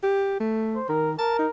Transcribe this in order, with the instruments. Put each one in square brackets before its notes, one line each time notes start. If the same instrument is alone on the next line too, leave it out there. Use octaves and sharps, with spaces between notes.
[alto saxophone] G4
A3
[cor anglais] C5
[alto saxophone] D#3 [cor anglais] A#4
[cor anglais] A#4 [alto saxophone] A5
[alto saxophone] D#4